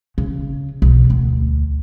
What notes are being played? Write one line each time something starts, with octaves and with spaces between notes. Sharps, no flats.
C#3
B1
D2